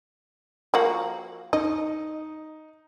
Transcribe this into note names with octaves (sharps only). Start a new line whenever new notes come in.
F3 A#3 F#4
D#4 D#5